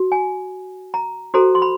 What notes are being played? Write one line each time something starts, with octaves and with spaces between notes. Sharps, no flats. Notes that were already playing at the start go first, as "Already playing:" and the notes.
Already playing: F#4
G#5
A#5
F#4 A4 C5 A#5
C6
B5